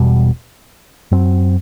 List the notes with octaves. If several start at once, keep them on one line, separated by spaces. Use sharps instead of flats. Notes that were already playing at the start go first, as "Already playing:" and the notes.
Already playing: E1 E2 B2 G3
F#2 F#3 C4